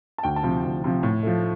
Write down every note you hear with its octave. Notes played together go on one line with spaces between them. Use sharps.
A5
D2 G5
A5
C3 F3
D2
C3 F3
A2
F3 A3